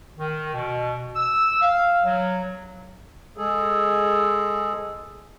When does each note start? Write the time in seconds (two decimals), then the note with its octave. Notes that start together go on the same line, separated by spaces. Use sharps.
0.18 D#3
0.54 B2
1.16 E6
1.62 F5
2.04 F#3
3.37 G#3 G#4 A4